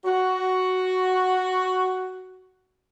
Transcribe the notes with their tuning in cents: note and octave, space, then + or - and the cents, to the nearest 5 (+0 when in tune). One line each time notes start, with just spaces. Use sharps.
F#4 +5